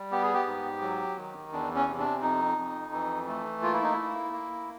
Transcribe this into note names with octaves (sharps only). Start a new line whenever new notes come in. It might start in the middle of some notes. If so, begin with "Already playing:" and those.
Already playing: G3
B3 G4
G#4
G4
G#2
F#3
D#3
E2 D4
C#4
C3
D4
F2 D#4
F2
E3
A3
A#3 F4
E4
D#4
A#3 E4
A#3